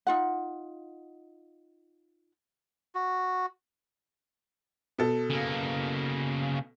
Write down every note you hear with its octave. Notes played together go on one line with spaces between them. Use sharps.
D#4 F4 F#5
F#4
B2 A4
C#3 A#3